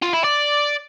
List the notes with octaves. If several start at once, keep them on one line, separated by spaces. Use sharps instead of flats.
F4
E4
D5